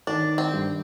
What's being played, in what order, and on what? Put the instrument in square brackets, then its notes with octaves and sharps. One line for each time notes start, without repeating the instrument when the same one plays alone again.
[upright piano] D#3 [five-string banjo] D4
[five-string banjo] C4
[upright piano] G2